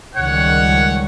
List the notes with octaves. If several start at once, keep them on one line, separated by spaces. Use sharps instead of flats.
C#2 D#3 G3 C#5 F#5